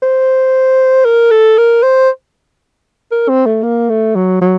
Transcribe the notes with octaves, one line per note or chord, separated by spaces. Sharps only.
C5
A#4
A4
A#4
C5
A#4
C4
A3
A#3
A3
F#3
F#3